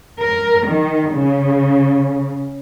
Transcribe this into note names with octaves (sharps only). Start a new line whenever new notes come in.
A#4
D#3
C#3